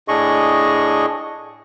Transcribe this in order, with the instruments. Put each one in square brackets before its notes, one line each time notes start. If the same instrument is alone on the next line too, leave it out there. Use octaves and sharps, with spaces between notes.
[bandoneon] A2 D4 G#4 D#5 C#6